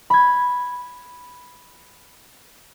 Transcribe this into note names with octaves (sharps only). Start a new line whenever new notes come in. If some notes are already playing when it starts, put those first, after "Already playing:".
B5 G#6